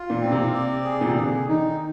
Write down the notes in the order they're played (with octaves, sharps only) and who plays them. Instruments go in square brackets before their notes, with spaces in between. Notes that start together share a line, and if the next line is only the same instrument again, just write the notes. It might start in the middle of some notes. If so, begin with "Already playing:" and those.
Already playing: [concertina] F4
[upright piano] A#2
[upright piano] A#2 [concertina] C4
[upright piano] C3
[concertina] D5
G#4
[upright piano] A#2
C3
[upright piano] D3 [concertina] G#4
[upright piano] D#3 [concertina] D#4